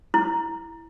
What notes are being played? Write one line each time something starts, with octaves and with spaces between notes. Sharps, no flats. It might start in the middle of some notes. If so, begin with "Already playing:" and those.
E4